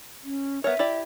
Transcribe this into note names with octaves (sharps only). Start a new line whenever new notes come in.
C#4
B3 A#4 C#5 E5
E4 G4 D5